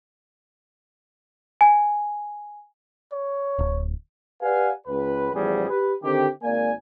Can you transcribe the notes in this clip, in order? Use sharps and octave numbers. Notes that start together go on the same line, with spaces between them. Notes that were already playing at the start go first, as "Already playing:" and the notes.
G#5
C#5
D1
G4 B4 D5 F5 F#5 G#5
C#2 B4
A1 E2 F3 G3 G#4
G4 B4
D3 D#3 C4 G4
G#1 A#3 D5 G#5